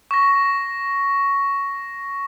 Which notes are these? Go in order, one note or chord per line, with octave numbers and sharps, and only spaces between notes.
C#6 A#6